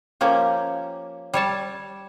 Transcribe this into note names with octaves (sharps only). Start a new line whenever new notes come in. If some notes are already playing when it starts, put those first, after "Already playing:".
F3 A#3 C#4 G4
G3 C#5 A5